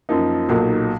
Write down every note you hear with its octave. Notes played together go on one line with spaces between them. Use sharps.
F#2 F3 A#3 D#4
B1 A#2 F#3 A#3 D#4